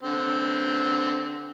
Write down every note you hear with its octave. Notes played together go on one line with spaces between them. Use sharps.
D3 C4